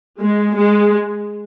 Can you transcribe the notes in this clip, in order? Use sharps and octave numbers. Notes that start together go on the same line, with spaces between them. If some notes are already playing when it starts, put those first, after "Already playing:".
G#3
G#3